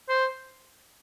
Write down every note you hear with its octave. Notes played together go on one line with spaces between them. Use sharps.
C5